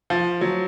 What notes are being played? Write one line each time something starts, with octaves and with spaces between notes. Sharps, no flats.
F3
F#3